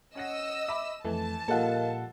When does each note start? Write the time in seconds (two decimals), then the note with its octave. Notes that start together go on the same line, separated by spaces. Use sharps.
0.15 C#4 D#5 F#5 E6 A#6
0.69 E5 B5 D6
1.05 F2 E3 A3 A5
1.48 A#2 F3 G3 A4 A#4 D#5 F5 F#5